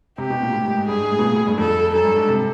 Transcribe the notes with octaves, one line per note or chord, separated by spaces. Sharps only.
C3 G4
B2
A#2
A2
G#2
G#2
G2 G#4
G#2
A2
B2
A#2
A2
G2
F2 A4
F#2 A4
G2
G#2
C3